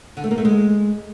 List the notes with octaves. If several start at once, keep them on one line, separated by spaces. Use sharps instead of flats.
D3
A3
A#3
A3
G#3